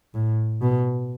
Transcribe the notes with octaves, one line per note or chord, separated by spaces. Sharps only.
A2
B2